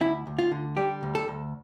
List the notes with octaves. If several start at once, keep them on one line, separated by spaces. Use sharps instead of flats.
D2 E4
D2
F4
D3
G3 G4
D2
A4
D2